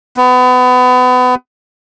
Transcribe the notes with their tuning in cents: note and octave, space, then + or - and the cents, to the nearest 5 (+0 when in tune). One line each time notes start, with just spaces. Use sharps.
B3 +30